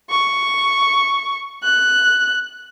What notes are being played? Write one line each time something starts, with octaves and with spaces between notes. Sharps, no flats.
C#6
F#6